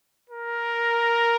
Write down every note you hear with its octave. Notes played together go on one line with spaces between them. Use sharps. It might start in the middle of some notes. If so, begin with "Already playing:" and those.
A#4